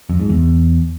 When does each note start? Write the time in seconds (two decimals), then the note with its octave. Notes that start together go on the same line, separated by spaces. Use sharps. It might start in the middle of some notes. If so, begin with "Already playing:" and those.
0.10 F2
0.20 G#2
0.30 E2